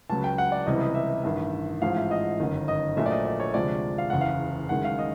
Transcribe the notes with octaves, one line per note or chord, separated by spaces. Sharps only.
C#2 C#3 F#3 A5
G5
F#5
D5
C#2 C3 E3 G3 D#5
D#5
E5
A1 G2 D#3
A1 G#2 F3 F5
E5
D#5
G1 F#2 D#3
D#5
A#1 A#2 F#3 A3 E5
D5
D#5
D5
C#5
D2 C3 F3 G#3 D5
F5
F#1 E2 C#3 F#5
F5
F#1 F#2 D#3 G#3 F#5
F5
D#5